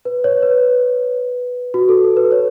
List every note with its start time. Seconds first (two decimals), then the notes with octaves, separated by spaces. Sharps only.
0.05 B4
0.24 C#5
0.43 B4
1.74 F#4
1.89 A4
2.03 A4
2.17 B4
2.32 C#5